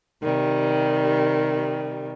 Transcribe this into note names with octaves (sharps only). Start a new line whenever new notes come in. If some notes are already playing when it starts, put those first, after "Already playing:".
C3 D#3 G3